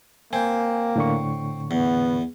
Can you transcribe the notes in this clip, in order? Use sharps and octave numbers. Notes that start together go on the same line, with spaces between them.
A#3 C4 G5 G#5
A2 D3 C#6
E2 B3